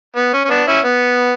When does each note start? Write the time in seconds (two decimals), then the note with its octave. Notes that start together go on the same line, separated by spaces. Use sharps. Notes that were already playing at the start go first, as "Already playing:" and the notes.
0.16 B3
0.33 C#4
0.45 C#4
0.50 B3 D4
0.67 C#4 E4
0.84 B3